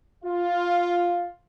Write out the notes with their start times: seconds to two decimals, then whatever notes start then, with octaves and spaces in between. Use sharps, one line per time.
0.24 F4